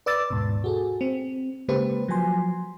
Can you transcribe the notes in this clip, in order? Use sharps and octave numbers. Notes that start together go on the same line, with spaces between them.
B4 D5 D6 E6 A6
D#2 G#2 B2
F#4 G#4 A4
C4
C#3 G#3 A#3 G4 B4 C5
F3 F#3 G#5 C6